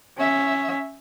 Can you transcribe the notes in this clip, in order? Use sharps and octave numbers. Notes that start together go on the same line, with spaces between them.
C#4 E5